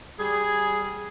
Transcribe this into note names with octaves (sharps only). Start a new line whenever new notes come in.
G3 G#4